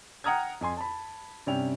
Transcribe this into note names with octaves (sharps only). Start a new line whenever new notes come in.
F#5 G5 A#5 D#6 F6 G#6
F2 G#5 C6
A5 B5
G2 C3 G3 C#4 G5 F7